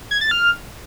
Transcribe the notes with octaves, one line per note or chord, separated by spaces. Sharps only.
G#6
A6
F6